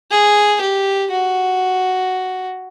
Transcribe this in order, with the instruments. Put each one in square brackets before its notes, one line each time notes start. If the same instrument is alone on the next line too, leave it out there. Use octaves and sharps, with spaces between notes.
[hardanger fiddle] G#4
G4
F#4